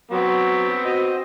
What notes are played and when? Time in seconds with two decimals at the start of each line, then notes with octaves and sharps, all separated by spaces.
0.11 F#3 B3 C4 F#4
0.85 F#4 C5 D#5